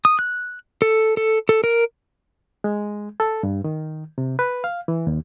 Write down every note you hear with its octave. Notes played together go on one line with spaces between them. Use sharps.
D#6
F#6
A4
A4
A4
A#4
G#3
A4
G2
D#3
C3
B4
F5
E3
D#2